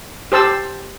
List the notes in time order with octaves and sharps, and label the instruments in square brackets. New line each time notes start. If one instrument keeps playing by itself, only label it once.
[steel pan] G4 C5 A5 E6